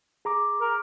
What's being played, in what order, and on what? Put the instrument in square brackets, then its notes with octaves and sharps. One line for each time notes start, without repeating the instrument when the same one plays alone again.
[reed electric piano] G#4 A#5 D6
[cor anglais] A#4